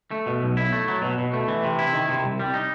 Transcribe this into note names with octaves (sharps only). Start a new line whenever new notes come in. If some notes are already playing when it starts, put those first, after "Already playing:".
A3
B2
B1
E4
A3
F#3
B2
B2
A3
E3
C3
E4
D#3
C3
C2
G3
D#4